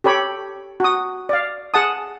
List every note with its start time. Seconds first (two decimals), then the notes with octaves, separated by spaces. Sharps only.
0.04 G4 A4 C#5 B5
0.80 F#4 D#6
1.29 D5 F5
1.74 G#4 F#5 A5 D#6